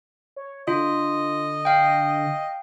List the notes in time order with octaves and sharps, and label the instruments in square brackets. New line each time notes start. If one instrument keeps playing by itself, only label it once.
[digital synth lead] C#5
[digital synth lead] D3 [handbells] F4 [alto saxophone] D#5
[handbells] F5 G5